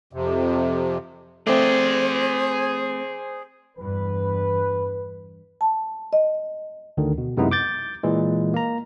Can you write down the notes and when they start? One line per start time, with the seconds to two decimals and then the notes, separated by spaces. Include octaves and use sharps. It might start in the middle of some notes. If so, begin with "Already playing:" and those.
0.13 F2 C3
1.47 A3 C4 G#4 C5 D5
3.78 E2 G2 B4
5.61 A5
6.13 D#5
6.97 D2 D3 D#3
7.18 B2
7.37 F#2 C3 G#3 B3 D#4 E4
7.51 D6 G6 A6
8.03 A#2 E3 G#3
8.54 A#3 A#5